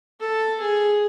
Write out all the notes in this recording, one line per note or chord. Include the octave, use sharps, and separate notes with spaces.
A4
G#4